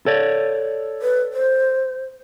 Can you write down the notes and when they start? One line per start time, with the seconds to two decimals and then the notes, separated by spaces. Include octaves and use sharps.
0.06 A4 C#5 D5
1.02 B4
1.33 C5